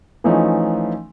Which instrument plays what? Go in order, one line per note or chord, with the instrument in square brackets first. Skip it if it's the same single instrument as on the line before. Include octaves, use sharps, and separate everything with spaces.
[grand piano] E3 F3 A3 C#4 D#4